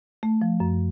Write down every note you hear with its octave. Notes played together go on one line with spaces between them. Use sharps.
A3
F3
F#2